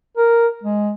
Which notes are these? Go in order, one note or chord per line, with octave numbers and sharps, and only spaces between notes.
A#4
G#3